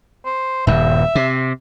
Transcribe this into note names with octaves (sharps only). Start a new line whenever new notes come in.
C5
D#1 G2 E5
C3